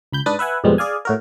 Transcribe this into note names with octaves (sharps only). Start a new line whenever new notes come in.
C#2 B5 G6
G#2 D4 B4 D#6 A6
B4 E5 F#5 G#5
F2 G#2 B2 G3 G#3 C4
G#4 D5 F5 G#5
A2 F#4 A#4